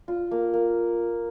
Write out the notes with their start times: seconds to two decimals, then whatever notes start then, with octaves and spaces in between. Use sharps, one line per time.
0.08 F4
0.31 A#3
0.54 A#3